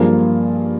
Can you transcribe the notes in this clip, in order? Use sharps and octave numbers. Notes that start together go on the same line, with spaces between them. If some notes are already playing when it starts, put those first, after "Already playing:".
Already playing: G2 F3 A#3 F4 G#4